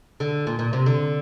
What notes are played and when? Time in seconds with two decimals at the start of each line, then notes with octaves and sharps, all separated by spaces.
0.20 D3
0.47 A#2
0.59 A#2
0.73 C3
0.86 D3